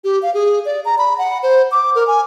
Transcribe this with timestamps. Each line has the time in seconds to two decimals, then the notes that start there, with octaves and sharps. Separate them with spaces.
0.04 G4
0.23 F5
0.34 G#4
0.66 D5
0.85 A#5
0.98 B5
1.18 F#5
1.43 C5
1.72 D6
1.95 A#4
2.07 G#5